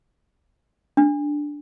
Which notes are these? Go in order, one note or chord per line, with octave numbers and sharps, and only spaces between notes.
D4